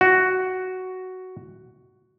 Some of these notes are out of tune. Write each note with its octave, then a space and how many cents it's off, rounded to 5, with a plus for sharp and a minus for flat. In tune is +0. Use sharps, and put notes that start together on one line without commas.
F#4 +5